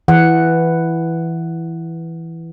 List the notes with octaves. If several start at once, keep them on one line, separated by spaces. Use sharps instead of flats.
E3 F#5